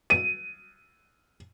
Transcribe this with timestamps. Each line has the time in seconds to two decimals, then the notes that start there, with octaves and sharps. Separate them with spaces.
0.10 D#7